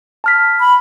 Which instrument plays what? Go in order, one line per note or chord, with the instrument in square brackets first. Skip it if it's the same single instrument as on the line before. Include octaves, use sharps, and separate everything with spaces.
[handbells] A5 F6 B6
[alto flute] B5